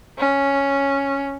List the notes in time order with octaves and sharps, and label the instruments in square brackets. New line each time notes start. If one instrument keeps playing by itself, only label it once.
[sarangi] C#4